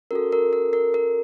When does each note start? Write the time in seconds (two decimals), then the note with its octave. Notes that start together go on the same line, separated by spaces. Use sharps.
0.11 C#4 F#4 A4 A#4
0.32 A#4
0.53 A#4
0.73 A#4
0.94 A#4